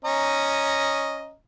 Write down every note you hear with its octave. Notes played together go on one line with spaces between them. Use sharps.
C#4 D#5 A#5